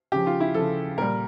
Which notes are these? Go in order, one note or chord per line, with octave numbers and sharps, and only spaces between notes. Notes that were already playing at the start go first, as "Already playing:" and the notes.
C#3 F3 G4
F4
E4
C#3 F3 A4
A#2 G3 A#4